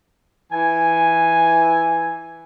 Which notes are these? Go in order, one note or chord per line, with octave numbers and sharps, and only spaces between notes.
E3 G#5